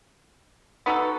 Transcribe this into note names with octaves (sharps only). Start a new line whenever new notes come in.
B3 D#4 F#4 A4